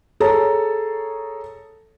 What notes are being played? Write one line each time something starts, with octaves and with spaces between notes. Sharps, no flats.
G#4 A4 C#5 A5 A#5